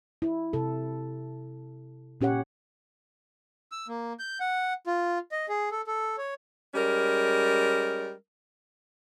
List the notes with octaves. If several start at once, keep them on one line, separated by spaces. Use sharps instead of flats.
E4
C3 A4
A#2 C#4 G4 C#5 F#5
E6
A#3
G6
F#5
F4
D#5
G#4
A4
A4
C#5
G3 G#3 C#4 A#4